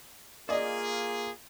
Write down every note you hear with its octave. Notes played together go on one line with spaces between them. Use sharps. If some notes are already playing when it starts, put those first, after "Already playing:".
A#3 F4 G#4 D5 D#5